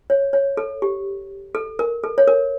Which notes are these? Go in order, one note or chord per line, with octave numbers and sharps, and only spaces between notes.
C#5
C#5
A4
G4
A4
A#4
A4
C#5
A#4